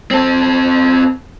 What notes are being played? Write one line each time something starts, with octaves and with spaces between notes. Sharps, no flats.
C4 A4